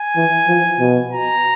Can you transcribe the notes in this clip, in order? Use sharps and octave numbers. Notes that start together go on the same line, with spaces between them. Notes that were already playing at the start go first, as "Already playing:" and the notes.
Already playing: G#5
E3
F3
B2
A#5